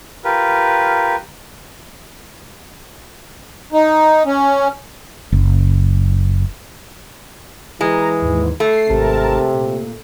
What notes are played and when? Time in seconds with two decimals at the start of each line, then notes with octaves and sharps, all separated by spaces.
0.24 F4 G4 A#4 B4
3.73 D#4
4.26 C#4
5.32 F#1
7.81 E3 G#3 A#5
8.22 D#2 G#2
8.60 A3 C7
8.89 G#1 C3 A#4 A5
9.54 A#2